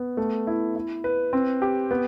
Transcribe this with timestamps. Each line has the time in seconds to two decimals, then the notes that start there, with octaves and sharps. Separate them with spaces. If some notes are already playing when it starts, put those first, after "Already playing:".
Already playing: B3
0.17 A3
0.47 E4
0.76 E4
1.04 B4
1.33 C4
1.62 G4
1.91 B3